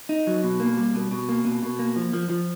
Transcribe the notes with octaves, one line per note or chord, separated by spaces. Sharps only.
D#4
F#3
B2
A#3
G3
B2
B2
A#3
B2
B2
A#3
F3
F3
F3